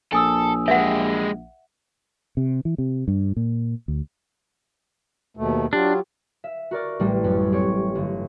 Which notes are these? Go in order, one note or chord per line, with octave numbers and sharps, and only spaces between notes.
A#1 A4 G#5 D#6 E6
G#3 G4 E5 F#5
C3
E3
C3
G2
A#2
D2
D#2 B2 A3
F#3 D4 F4 G4
E5
F#4 A#4 D5
A1 G3 A3
F#2 C#4
C4 G4 C#5
G1